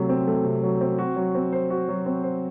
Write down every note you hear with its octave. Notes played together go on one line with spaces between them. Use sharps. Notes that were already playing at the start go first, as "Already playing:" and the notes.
Already playing: C3 F#3 A3
C4
A3
C3
F#3
C4
F#4
F#3
C4
C5
F#4
F#3
C4
C5